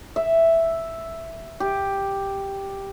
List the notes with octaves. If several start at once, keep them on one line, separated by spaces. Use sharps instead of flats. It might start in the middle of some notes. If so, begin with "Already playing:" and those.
E5
G4